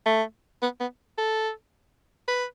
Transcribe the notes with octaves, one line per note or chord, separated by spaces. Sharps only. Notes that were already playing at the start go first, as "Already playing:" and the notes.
A3
B3
B3
A4
B4